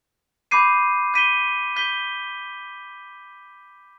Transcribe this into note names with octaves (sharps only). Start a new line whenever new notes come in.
B5 D6 G6 C7 D#7
G6 B6 D#7 G7
G6 B6 D#7 G7